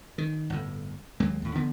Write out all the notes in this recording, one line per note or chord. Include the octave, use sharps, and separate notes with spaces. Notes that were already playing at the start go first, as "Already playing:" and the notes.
D#3
G1 A2
D#2 F#3 G#3 A#3
D#2 A2
D3 F3 B3